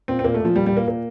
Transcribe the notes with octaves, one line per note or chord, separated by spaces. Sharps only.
A#2 C4
C4
A#2 A#3
A3
A#2 F3
A#2 G3
G3
A#2
A#3
A#2 A#3